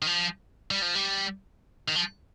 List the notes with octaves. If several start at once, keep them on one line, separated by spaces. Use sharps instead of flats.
D#3
F3
G3
F3
G3
D#3
F3